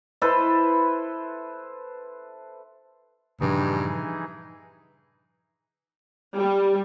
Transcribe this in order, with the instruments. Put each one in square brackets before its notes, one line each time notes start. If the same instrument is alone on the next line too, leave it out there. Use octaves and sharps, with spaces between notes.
[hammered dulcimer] E4 A4 B4 C5
[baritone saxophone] G2 [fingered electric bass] A#2 C#3 F3 [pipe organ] E3 D#4 G#4
[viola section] G3